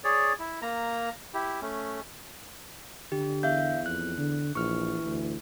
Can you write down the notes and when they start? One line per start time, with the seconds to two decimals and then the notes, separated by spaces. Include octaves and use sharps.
0.04 G#4 C#5 D5
0.39 E4
0.62 A#3 A#5
1.34 E4 G4
1.61 A3 C#4
3.12 D3 G4
3.43 E2 E5 F5 G6
3.86 F2 F#6
4.18 D3
4.55 A#1 E3 C#6 F6
5.05 D2